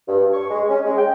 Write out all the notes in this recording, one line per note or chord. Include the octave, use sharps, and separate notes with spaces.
G2
C#6
G#3
C#4
G#3
G5